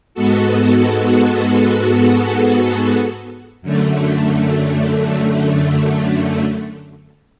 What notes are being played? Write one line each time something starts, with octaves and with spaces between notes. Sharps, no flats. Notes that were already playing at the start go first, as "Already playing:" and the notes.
G#2 G#3 B3 F#4 A4
F#2 D3 A3